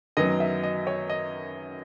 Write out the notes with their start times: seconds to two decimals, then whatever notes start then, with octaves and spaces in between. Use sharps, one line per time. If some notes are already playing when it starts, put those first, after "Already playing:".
0.17 F#2 D#3 F#3 B3 D#5
0.40 E5
0.63 D#5
0.87 C#5
1.10 D#5